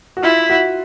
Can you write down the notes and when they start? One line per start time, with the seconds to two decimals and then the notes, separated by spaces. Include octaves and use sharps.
0.17 F#4
0.23 E4 F4
0.50 F#4